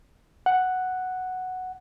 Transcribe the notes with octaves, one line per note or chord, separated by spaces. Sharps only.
F#5